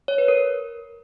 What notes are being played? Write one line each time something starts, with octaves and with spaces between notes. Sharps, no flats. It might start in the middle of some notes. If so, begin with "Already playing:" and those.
C#5
B4
A#4